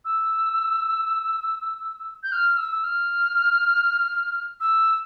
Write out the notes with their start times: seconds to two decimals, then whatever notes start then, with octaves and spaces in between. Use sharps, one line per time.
0.05 E6
2.23 G6
2.32 F6
2.57 E6
2.71 E6
2.84 F6
4.60 E6